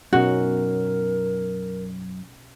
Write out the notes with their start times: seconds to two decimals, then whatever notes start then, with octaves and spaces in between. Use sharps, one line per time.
0.13 F#2 B2 C#4 D#4 F#4 A#4